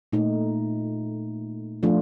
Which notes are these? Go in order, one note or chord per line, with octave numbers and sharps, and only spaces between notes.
A#2 A3 D#4
F3 A3 D4 F4